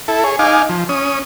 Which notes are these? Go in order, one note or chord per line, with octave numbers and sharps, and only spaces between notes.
E4 A4
G#4 C#5
D#4 F5 G#5 D6
F3
C#4 D#6